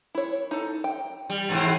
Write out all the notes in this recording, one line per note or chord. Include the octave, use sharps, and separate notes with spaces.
E4 C#5
D#4 A4
G5
G3
G#2 C3 E3